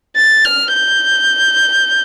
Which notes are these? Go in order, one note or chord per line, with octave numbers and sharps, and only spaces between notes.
A6
F6
G6